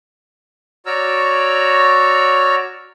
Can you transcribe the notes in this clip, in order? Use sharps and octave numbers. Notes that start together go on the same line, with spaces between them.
F#4 C#5 D5 A#5 E6 F6